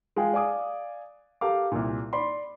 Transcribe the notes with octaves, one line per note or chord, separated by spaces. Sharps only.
G#3 F4 G#4 G5
D5 F5 G#5 D6 D#6
G4 A4 A#4 F5 D6
C2 A#2
D5 B5 C6